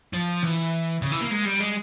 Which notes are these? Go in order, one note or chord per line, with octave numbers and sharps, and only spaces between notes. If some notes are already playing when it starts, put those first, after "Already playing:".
F3
E3
C#3
E3
A#3
G#3
G3
G#3